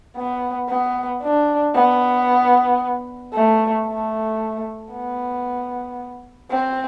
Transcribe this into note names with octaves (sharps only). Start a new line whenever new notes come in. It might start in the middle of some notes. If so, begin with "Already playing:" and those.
B3
B3
D4
B3
A3
A3
B3
C4